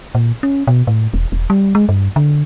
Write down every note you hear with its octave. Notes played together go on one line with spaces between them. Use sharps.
A#2
C#4
B2
A2
E1
E1
G3
G#3
G2
D3